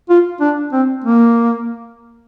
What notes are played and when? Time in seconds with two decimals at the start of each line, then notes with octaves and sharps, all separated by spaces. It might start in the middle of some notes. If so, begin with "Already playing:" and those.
0.09 F4
0.41 D4
0.72 C4
1.04 A#3